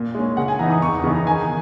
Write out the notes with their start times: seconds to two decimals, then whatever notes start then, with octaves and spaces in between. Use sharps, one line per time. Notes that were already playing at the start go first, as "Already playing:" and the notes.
Already playing: A#2
0.15 G#3 C#4
0.37 C#3 F#5
0.48 G#5
0.59 E3 B3 D#4 A#5
0.70 D#6
0.82 E2 C#6
1.04 C#3 E3 B3 D#4
1.15 A#5
1.26 D#3 G#5